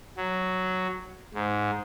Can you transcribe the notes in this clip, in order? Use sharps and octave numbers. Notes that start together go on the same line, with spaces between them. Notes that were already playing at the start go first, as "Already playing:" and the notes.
F#3
G#2